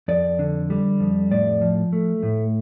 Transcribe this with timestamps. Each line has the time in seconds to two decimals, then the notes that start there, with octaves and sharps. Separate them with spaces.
0.08 F2 D5
0.39 D3
0.70 G3
1.00 F2
1.31 A2 D5
1.61 F3
1.93 A3
2.23 A2